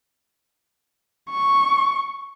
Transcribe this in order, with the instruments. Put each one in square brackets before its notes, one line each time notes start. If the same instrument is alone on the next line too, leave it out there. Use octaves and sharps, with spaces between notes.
[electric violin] C#6